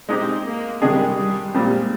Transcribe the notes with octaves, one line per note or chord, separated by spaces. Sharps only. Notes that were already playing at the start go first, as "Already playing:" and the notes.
G#3 C4 D#4 G4
A#3
C3 D#3 G3 G#3 D4 G#4
G3
A#2 G3 G#3 C4